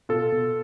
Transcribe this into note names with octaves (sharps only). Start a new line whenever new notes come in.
B2 F4 A4
B2